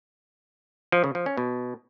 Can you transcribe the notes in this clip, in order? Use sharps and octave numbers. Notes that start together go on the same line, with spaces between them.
F3
C#3
F3
C#4
B2